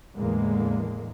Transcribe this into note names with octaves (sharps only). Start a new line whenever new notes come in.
E2 A2 D3 G#3 A#3